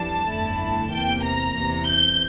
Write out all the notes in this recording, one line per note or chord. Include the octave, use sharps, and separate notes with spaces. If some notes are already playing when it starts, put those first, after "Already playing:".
Already playing: F2 E3 G3 D4 A5
G1 F2 D3 A3 E4
E2 C3 E3 A#3 G5
A#5
E2 C3 E3
G6